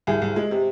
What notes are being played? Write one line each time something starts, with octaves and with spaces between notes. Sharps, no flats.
C2 G#4
C2
G#3
C3